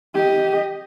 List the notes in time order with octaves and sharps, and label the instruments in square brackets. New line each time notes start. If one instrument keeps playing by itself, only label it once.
[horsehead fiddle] G4 D#5